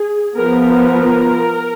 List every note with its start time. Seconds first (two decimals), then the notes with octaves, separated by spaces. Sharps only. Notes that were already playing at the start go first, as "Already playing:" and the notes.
Already playing: G#4
0.37 F3 B3 A#4
0.69 A#4